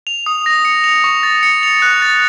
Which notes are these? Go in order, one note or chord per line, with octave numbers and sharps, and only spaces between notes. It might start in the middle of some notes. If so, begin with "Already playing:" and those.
F7
D#6
A#6
C#7
F7
C#6
A6
C#7
F7
F#6
A6